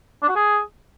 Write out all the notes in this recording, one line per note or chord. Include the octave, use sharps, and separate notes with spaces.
D4
F#4
G#4